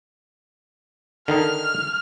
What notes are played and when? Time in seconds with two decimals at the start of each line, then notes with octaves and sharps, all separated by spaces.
1.28 D3 D#3 D#4 F6